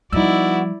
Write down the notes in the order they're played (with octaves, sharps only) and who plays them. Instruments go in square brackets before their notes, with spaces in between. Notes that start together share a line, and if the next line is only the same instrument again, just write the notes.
[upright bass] F3 G3 [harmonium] B3 F#4 [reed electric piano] D#4 E6 [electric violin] E4 D5